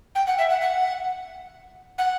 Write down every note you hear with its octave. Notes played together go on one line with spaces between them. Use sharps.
G5
F#5
E5
F#5
F#5
F#5